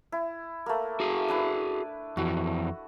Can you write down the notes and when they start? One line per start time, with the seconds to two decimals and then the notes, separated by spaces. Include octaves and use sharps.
0.12 E4
0.66 A3 A#3
1.00 F#4 G#4
1.28 D4 E4 B4
2.17 F2 E3 F#4